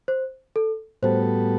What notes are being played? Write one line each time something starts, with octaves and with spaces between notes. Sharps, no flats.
C5
A4
A2 G3 B3 F#4 A4 C5